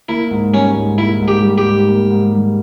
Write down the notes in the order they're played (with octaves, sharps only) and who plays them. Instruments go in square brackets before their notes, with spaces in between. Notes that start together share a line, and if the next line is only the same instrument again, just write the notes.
[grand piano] A#3 [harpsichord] E4
[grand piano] G#2
[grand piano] G3 [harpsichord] C#4
[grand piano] G#2
[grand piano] A#3 [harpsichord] E4
[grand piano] G#2
[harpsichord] G4
[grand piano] G3
[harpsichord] G4
[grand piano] G#2
A#3
G#2
G3